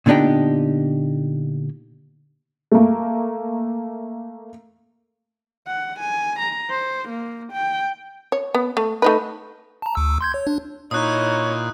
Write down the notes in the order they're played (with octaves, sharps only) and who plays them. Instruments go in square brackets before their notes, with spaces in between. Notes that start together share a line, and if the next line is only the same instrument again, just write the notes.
[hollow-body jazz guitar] A#2 D3 B3 D4 D#4 G4
[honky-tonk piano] A3 A#3
[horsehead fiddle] F#5
G#5
A#5
C5
A#3
G5
[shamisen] C#5
B3
A3
A3 D#4 B4
[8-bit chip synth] A5 A#5
D2 E6
C6 G6 G#6
C#5
D4
[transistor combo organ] A#2 [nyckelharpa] D#4 E4 [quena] C#5 [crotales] D#6 F#6